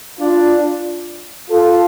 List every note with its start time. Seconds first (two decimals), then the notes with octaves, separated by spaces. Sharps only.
0.18 D4 F4
1.51 F4 A4